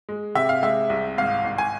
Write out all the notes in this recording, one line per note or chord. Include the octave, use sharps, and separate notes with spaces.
G#3
C3 E5
F5
G#3 E5
C2
G#1 F5
G#1
G#5